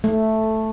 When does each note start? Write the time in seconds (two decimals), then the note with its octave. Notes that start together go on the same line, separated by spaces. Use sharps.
0.04 A3